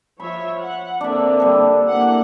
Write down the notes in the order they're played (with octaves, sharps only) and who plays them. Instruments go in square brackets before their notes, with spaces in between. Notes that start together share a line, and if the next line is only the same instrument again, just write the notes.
[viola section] F3 C#5 E5 [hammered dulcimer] B5
[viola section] F#5
[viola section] D3 A#3 C4 [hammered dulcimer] D4 E5
[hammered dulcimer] G3 A4
[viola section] A#3 E4 F#5